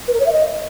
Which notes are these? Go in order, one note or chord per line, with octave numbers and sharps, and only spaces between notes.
B4
A#4
C#5
E5
D#5